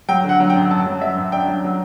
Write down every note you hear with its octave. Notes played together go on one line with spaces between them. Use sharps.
F#3 G5
D3
F#5
F#3
G5
F#2
F#2 A5
F#3
F#3 E5
F#2
D4 G5
F#3
F#3